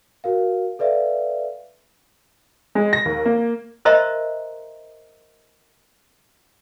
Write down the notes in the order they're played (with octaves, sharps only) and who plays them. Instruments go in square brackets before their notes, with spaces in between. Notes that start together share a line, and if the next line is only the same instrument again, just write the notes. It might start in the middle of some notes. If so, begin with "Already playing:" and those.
[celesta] F#4 A#4 F5
A4 B4 D5 E5 F5
[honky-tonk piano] G#3
A#6
D#2
A#3
[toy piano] A#4 C5 D#5 E5 A#5 C6